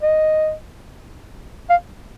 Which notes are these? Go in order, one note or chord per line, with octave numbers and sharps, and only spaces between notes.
D#5
F5